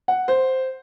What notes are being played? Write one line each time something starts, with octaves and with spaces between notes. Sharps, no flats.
F#5
C5